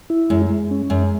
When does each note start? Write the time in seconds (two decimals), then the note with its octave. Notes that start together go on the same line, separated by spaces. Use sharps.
0.10 E4
0.30 F#2 G#3
0.50 G#3
0.71 C#4
0.90 F#2 G#3